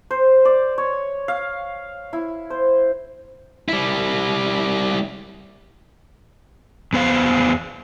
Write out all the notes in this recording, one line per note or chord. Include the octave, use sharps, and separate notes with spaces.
C5
D5
C#5
F5
E4
C5
G3 E4
E2 B3 C5 F5